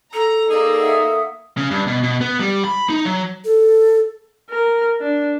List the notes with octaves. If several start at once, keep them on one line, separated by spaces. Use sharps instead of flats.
A4 A#5
A#3 D#4 G#4 D5
E5 F#5 D#6
C#3
G2
B2
B2
B3
G3
B5
D#4
F#3
A4
A#4
D4